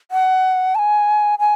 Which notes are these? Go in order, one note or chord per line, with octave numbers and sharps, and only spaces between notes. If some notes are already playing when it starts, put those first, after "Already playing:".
F#5
A5
G#5
G#5